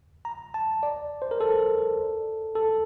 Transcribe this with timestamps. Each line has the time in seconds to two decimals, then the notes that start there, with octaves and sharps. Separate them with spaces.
0.25 A#5
0.54 A5
0.83 D5
1.22 C5
1.31 A#4
1.41 A4
2.55 A4